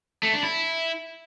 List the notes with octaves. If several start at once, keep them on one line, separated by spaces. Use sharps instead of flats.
A3
D4
E4